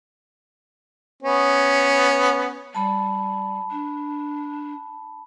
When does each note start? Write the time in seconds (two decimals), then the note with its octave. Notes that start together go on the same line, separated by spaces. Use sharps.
1.23 B3 C#4
2.75 G3 A5 B5
3.71 D4